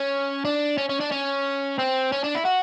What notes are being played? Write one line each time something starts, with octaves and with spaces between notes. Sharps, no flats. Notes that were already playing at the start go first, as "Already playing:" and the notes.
Already playing: C#4
D4
C#4
C#4
D4
C#4
C4
C#4
D4
E4
F#4